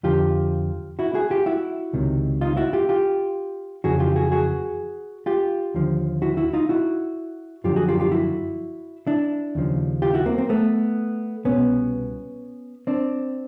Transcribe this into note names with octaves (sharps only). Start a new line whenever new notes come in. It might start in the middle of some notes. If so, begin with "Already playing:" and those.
F2 D3 F3 F4 G4
E4 F#4
F#4 G#4
F4 G4
E4 F#4
C#2 C3 D#3
D#4 F4
E4 F#4
F4 G4
F4 G4
F2 C#3 E3 F#4 G#4
F4 G4
F#4 G#4
F#4 G#4
F4 G4
D#2 D3 F3
E4 F#4
E4 F#4
D#4 F4
E4 F#4
F#2 D3 F3 F4 G4
F#4 G#4
F4 G4
F4 G4
E4 F#4
D4 E4
D#2 C#3 F3
F4 G4
E4 F#4
A#3 C4
A#3 C4
A3 B3
C2 B2 B3 C#4
C4 D4